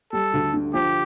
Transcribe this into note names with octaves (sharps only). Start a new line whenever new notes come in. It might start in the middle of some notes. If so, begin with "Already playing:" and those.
G3 A4
D2
D3
F3 G4